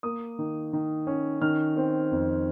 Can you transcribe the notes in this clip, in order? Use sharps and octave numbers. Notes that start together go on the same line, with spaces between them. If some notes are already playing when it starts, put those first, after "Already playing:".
A#3 D#6
D#3
D#3
C#4
D#3 F6
C4
F2